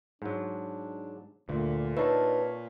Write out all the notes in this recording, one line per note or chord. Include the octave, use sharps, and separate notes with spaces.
G#2 F#3 D4
D2 A#2 D3
D4 D#4 B4 C#5 E5 A5